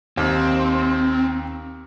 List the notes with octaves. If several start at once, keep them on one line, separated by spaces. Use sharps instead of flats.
D#2 C4